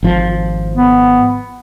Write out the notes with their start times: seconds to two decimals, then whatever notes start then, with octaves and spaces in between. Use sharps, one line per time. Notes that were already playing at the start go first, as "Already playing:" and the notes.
0.03 G#1 F3
0.76 B3